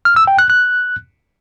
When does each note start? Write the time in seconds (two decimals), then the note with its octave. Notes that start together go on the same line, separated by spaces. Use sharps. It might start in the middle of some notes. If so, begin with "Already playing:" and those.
0.05 F6
0.16 E6
0.27 G5
0.39 F#6
0.50 F#6